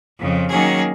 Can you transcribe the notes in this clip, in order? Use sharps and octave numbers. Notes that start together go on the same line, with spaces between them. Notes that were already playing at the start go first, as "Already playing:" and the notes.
F2 C#3 F3
D#3 F#3 A#3 C#4 G#4